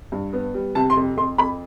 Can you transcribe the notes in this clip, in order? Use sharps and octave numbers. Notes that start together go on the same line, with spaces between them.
G2
B3
G3
C3 A5
C6
F2
F2 C6
F2 B5